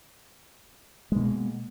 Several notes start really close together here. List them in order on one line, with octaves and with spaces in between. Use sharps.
G#3 B2 A#3